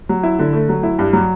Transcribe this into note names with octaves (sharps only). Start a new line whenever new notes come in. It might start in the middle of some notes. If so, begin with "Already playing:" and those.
F#3
E4
D3
A3
F#3
E4
G2
F#3